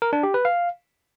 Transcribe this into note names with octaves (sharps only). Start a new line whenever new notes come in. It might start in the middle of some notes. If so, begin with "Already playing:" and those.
A#4
D4
G4
B4
F5